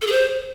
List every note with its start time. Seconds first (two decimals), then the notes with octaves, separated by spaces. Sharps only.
0.02 A4
0.07 G#4
0.12 C5